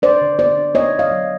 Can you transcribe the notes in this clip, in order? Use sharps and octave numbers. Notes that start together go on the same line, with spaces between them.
D4 C5 D5
D3
B3 C5 D5
D4
B3 C#5 D#5
B3
D#5 F5
F#3